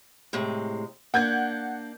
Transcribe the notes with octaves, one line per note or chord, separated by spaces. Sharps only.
A2 C3 G#3
A#3 D4 F#5 G6 G#6